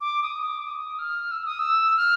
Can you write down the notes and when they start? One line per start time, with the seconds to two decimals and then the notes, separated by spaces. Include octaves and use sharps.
0.01 D6
0.23 D#6
0.43 D6
0.66 D#6
0.99 F6
1.31 E6
1.45 D#6
1.59 E6
1.97 F6